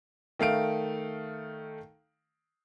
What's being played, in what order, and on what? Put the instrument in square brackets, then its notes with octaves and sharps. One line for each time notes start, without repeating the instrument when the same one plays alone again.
[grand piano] D#3 A3 F5 D7